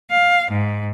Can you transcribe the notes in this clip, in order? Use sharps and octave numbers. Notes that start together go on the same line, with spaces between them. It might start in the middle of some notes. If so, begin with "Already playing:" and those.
F5
G#2